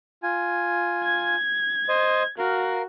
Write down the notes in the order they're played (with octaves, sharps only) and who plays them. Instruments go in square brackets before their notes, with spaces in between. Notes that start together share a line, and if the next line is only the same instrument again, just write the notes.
[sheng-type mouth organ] F4 G#5
[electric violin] G#6
[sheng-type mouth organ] C5 D#5
[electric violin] F#4 [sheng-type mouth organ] A#4 F5